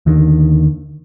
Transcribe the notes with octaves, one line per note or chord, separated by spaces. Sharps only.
D#2 D3 D#3